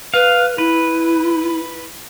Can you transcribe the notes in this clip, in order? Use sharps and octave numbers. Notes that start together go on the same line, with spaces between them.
B4 F5
E4 B4